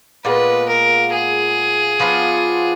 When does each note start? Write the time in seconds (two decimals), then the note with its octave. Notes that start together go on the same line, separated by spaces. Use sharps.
0.25 A#2 G#3 B3 F4 B4
0.68 A#4
1.13 G#4
2.00 F3 B3 D4 F4